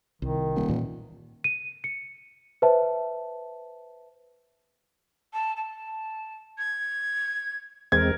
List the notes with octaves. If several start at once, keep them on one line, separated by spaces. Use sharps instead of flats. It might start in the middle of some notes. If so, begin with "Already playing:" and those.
C2 D#3
D#1
A#2 E3 G3
D#7
C#7
B4 C5 E5 A5
A5
A5
G#6
E2 G#3 C4 A#4 G#6